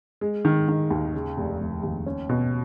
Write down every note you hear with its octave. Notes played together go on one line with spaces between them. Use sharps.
G#3
D#3
D#3
D#2
C#3
F1
F1
D#2
C#4
B2